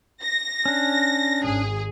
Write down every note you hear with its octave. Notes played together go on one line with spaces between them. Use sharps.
A#6
C#4 D4
G#1 G#4